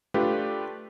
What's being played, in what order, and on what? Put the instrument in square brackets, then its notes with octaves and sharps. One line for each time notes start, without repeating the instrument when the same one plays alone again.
[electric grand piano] A3 D4 F4 G4 B4